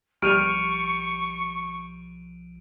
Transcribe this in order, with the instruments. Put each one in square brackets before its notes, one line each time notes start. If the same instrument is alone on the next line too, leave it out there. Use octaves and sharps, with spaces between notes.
[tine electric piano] B1 F3 [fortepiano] G3 F6 [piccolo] C#6 [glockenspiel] D7 D#7 F7